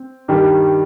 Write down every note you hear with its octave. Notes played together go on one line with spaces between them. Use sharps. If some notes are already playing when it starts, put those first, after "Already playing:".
Already playing: C4
G2 D#3 G3